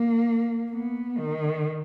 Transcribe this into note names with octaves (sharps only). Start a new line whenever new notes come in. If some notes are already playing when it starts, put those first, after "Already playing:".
Already playing: A#3
B3
D#3